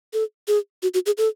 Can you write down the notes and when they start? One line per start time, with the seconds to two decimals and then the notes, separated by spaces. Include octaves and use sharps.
0.13 A4
0.48 G#4
0.83 F#4
0.94 F#4
1.06 G#4
1.18 A4